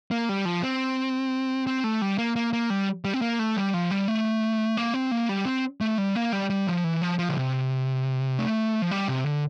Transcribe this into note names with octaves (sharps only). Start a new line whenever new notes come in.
A#3
G3
F3
C4
C4
A3
G3
A#3
A#3
A#3
G3
G3
C4
A#3
A3
G3
F3
G3
A3
A#3
C4
A#3
G3
C4
A3
G3
A#3
G3
G3
F3
E3
F3
F3
D3
C3
A3
F3
G3
C3
D3